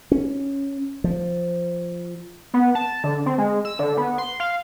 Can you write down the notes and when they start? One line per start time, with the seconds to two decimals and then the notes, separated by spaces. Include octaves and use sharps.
0.12 C#4
1.04 F3
2.54 B3
2.75 A5
3.04 D3
3.26 C4
3.38 G#3
3.65 E6
3.79 D3
3.97 B3
4.18 C6
4.40 F5